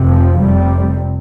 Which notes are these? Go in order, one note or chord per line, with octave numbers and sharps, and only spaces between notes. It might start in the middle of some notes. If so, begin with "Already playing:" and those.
Already playing: F1 F2 C3
F3
F1 F2 C3 G3